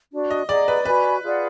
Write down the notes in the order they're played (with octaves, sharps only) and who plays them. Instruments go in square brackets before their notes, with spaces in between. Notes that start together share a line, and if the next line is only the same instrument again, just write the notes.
[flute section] D4 F#4 D5
[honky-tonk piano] D#5
[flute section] G#4 D#5 F#5 A#5 [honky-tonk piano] D5
[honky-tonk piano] B4
[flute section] F#4 D5 G#5 B5 [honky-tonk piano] B4
[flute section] F4 G#4 D5 F#5